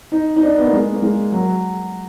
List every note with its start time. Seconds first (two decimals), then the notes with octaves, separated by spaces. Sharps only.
0.12 D#4
0.36 D#4
0.42 D4
0.58 B3
0.67 A#3
0.73 G#3
0.94 A#3
1.02 G#3
1.32 F#3